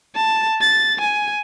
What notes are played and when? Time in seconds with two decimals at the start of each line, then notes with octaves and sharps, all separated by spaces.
0.16 A5
0.61 A6
1.01 G#5